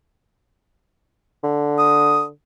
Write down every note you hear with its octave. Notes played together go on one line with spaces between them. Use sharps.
D3
D#6